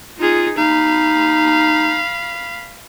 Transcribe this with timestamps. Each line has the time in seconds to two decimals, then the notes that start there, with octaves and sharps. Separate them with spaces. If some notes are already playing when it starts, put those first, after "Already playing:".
0.19 D#4 F4 G#4
0.58 D#4 F5 B5